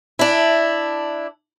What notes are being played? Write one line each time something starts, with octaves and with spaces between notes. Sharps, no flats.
D4 E4